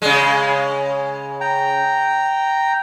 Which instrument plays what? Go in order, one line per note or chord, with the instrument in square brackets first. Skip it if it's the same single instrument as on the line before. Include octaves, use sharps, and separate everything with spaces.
[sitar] C#3 G#3
[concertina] G5 A#5